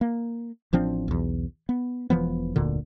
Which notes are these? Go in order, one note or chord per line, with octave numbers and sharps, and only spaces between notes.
A#3
A1 F3 C4 D4
B1 E2
B3
E1 E3 F3 B3
F1 D2 A#2 D3